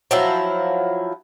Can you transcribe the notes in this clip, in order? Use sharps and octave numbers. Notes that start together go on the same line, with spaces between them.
F3 F#3 E4